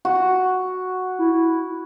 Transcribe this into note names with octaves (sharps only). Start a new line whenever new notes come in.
F#4
E4